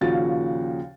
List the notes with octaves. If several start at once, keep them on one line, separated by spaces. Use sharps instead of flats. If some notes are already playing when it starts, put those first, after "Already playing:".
D#2 A#2 C#3 F3 F#4 A6